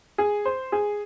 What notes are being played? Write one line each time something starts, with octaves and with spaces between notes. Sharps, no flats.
G#4
C5
G#4